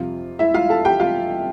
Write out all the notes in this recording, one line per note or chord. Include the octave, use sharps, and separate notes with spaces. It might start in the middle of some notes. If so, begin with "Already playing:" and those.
Already playing: F2 C3 G3 F4
E4 E5
F4 F5
A4 A5
G4 G5
F4 F5